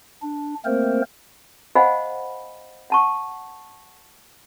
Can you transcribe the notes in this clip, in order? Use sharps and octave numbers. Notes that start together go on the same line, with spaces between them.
D4
A3 A#3 C4 A#4 C5
C5 D#5 F5 F#5 G#5 B5
F#5 A5 C#6